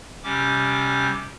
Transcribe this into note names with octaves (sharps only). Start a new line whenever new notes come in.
C3 G3 C#4 D6